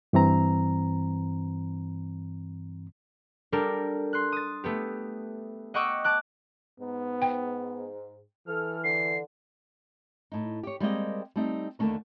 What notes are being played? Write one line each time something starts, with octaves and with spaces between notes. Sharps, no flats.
G2 E3 C4 A#5
G3 D4 G4 A4 A#4
C6 F#6
D#6 A6
A3 B3 G4
D#5 F#5 G5 C#6 D6 E6
A5 D6 F#6
G#2 B3
G5
E3 A4 F6
D3 C7
A2 D#4
G4 C#5
G3 G#3 A#3 C4 G4 D#5
G3 A3 C4 D#4
D#2 D3 F#3 A3 C#4 A#4